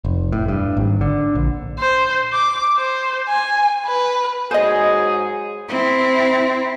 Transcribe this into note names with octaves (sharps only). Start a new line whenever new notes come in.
F1
A2
G2
G#1
D3
A#1
C5
D6
C5
G#5
B4
G#2 F#3 G#4 C5 D#5
C4 E4